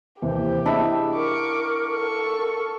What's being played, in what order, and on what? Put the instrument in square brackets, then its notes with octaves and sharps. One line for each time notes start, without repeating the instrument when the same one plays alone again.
[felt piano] D#2 C3 E3 [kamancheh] G4 [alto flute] C5
[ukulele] D4 E4 [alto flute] G#4 [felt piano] D#5 E5
[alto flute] A#4 [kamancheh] C#6 D6
[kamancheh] A4 C#6
[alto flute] A#4